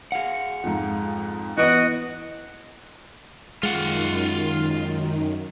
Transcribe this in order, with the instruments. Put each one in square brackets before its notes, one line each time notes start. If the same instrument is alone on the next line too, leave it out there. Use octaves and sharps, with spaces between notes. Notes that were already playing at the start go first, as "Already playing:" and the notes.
[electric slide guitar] G#4 F5 F#5
[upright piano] F2 G#2
[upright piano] E3 B3 D7 [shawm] F#4 [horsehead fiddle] D#5
[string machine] F#2 D#3 [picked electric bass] G#3 [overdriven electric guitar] F4 F#5